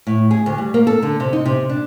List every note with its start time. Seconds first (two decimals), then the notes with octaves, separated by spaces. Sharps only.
0.07 A2
0.31 G#4
0.46 D2
0.58 G3
0.74 A#3
0.87 A4
1.03 D3
1.20 C3
1.33 D#4
1.46 C3
1.70 D4